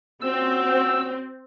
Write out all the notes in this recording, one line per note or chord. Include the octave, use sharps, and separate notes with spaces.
A#2 C4 C#4 F#4 E6